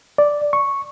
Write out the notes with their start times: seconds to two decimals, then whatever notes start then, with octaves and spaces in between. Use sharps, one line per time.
0.18 D5
0.53 C#6